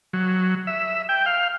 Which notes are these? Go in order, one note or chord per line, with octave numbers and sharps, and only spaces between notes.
F#3
E5
G5
F5